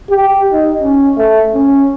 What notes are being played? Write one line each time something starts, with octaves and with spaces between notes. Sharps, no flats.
G4
D#4
C#4
A3
C#4